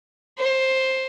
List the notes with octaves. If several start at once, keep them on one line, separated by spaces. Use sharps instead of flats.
C5